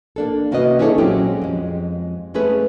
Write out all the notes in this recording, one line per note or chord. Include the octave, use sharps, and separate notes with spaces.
A#3 D4 A4
C3 A#3 C#4 F#4 B4 D#5
C#4 D4 E4 G#4 A4 C#5
A#2 F#3 G#3 C4 C#4 G4
F2 G#3
G#3 A3 C#4 G#4 B4